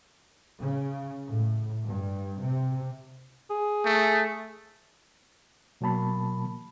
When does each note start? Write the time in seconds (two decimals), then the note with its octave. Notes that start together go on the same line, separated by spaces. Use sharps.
0.59 C#3
1.29 A2
1.84 G2
2.42 C3
3.50 G#4
3.85 A3
5.81 B2 F#3 A#3 A5 B5